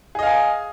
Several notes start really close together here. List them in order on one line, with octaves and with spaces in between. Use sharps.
G#4 D#5 F5 G#5